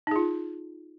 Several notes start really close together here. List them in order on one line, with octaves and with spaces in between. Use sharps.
D#4 G#4 F4